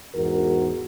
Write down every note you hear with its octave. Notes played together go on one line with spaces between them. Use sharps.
E2 G#2 D#4 F#4 G#4 A#4